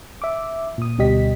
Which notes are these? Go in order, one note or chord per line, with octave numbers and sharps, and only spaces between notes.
E5 D6
A#2 D#6
D2 B2 G3 G4 D#5 B6